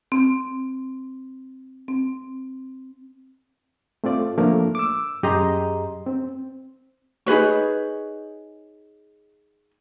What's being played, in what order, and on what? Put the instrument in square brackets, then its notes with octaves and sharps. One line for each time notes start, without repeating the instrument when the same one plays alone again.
[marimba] C4
C4
[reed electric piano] A3 C4 F4 D5
F3 A3 A#3 D4 A#4
D6 E6
F#2 G4 G#4 D#5 A#5 C6
C4
[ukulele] D#4 G#4 B4 C#5